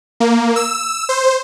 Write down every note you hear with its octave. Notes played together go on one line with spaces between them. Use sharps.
A#3
E6
C5